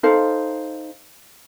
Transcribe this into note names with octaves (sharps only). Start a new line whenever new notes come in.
D#4 A4 C5 F5